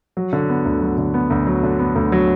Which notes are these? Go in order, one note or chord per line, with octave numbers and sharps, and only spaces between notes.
F#3
D3
B3
D2
F#3
D3
B3
D2
F#3
D3
B3
D2
F#3